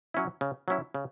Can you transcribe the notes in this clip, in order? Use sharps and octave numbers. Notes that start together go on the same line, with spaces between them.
F#3 C#4 E4
C#3
F#3 C#4 E4
C#3